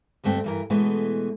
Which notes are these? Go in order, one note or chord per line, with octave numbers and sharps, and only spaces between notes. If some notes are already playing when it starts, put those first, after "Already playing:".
D2 G2 A3 C4 G5
G2 E3 A#4
B2 E3 G#3 A3 B3